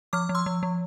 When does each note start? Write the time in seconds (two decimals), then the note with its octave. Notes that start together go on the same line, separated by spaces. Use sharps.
0.13 F3 D6 F6
0.29 F3
0.35 C6 E6
0.46 F3
0.63 F3